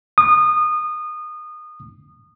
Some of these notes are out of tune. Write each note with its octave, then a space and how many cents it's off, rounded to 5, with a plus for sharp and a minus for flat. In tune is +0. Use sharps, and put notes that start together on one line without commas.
D#6 -25